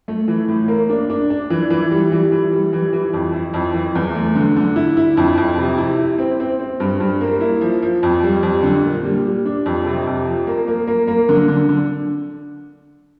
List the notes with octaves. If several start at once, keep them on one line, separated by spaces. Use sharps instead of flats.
A3
E3
A2
A#3
D4
D4
D4
E3
E3
G3
E3
E3
G3
E3
E3
F2
E4
F2
E3
E2
A3
D3
D3
E4
E4
F2
F2
C3
E4
E4
C4
C4
C4
G2
G2
A#3
E4
F3
F3
F2
G3
F2
D3
A#2
G3
G3
D4
F2
C3
F2
F3
A#3
A#3
A#3
A#3
D3
D3
D3